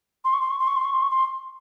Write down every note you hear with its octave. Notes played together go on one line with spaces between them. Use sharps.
C6
C#6
C6
C#6
C6
C#6
C6
C#6
C6
C#6
C6